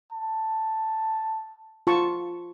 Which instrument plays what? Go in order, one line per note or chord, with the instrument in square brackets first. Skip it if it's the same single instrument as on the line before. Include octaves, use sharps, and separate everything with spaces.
[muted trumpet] A5
[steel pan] F4 A5 C#6